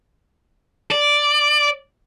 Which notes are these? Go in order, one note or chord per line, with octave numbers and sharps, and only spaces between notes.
D5